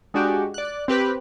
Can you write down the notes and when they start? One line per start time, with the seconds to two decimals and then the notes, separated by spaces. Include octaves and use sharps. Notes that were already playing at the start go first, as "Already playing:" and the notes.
0.14 G#3 D4 F#4 G4
0.54 D5 F#6
0.88 C4 G4 B4 B5